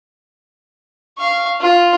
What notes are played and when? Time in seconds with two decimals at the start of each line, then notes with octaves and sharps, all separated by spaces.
1.18 F5 C#6
1.61 F4